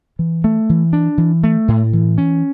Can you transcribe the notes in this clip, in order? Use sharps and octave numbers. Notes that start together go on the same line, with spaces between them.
E3
A3
E3
D4
E3
A3
A2
E3
C#4